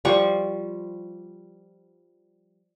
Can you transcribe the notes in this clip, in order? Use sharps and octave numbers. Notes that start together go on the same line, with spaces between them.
F3 G3 C#6